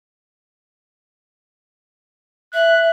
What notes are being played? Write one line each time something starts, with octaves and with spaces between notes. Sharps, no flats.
E5 F#6